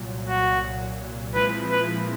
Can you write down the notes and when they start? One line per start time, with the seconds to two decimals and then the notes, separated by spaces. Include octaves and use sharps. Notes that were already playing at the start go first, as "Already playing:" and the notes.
Already playing: C2 A#2 F#3
0.28 F#4
1.35 A#2 F3 G#3 C4 E4 B4
1.71 B4